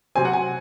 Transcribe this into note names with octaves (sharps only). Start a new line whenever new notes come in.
C3 F#3 C4 G#5
F#5
G#5